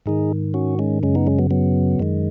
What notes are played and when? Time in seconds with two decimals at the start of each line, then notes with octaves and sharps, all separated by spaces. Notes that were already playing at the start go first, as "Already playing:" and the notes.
0.06 G#2 D#3 D#4 G#4
0.54 C#4 F#4
0.79 G#3 C#4
1.03 F#2 C#3 G#3 C#4
1.15 B3 D#4
1.27 G#3 C#4
1.39 F#3 B3
1.51 F#3 B3
2.00 F#2 D#3 G#3